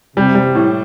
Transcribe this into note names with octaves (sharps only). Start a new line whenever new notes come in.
C3 G3
G3
A2